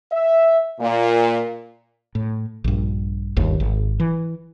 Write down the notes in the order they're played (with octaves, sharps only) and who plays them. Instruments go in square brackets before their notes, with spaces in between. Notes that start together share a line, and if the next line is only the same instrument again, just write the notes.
[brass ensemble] E5
A#2
[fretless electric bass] A2
A#1 G2
G1 D#2
G#1
E3